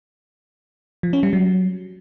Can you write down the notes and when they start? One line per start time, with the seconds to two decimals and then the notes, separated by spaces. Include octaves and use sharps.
1.03 F3
1.13 C#4
1.23 G3
1.33 F#3